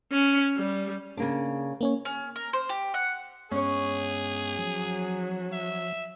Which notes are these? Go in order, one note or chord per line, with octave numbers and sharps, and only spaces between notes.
C#4
G3
C#3 A#3 D4
A#3 C#4 C#5
C#4
A#4
C5
G4
F#5
G2 G#3 B3 C#4 G#4 C#5
F3 F#3
E5